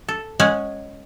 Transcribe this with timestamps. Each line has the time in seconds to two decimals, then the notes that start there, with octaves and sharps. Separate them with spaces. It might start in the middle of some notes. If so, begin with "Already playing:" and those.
0.09 A4
0.40 G#3 C#4 F#5 G#5